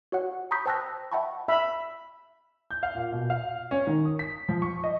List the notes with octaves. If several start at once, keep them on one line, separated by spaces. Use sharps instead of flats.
F#4 C#5 F#5
A#5 B5 C#6 D#6 G6 B6
C5 G5 A5 E6 F#6 A#6
E5 F#5 G5 A5 B5 C#6
E5 B5
G6
F5
A#2
B2
F5
C#4
D#3
D#6
B6
F3
C#6
D#5